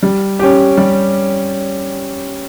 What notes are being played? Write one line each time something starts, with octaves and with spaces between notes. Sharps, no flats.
G3
C#4 G4
G3